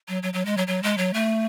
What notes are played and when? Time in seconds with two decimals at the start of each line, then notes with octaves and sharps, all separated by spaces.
0.08 F#3
0.23 F#3
0.33 F#3
0.45 G#3
0.57 F#3
0.67 F#3
0.83 G#3
0.98 F#3
1.14 A3